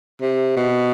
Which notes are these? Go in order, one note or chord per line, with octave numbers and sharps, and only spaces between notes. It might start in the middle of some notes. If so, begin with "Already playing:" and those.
C3
B2